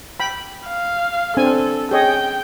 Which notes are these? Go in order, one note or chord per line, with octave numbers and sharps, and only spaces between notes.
G5 B5
F5
C4 D4 A4 G#5
G#4 C#5 D#5 G5